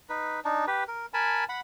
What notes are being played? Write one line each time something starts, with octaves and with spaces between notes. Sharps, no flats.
D#4 B4
D4 D#4
G4 B4
A#4
A#4 G#5 A5 B5
F#5 B5